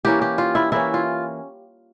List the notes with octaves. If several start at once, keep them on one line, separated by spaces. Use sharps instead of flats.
E3 A#3 C#4 G4
G4
F4
E4
E3 A#3 C#4 E4
F4